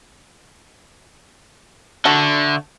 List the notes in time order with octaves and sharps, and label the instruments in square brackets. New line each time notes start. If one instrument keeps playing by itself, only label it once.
[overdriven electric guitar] D3 [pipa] A3 F#4 A4